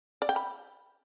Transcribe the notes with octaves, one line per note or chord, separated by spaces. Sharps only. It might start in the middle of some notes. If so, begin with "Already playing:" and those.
D5
G5
B5